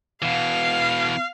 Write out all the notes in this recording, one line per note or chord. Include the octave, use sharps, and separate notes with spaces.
B2 E3 F5